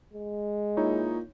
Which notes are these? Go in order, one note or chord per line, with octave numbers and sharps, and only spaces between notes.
G#3
A#2 D#4 E4 C#5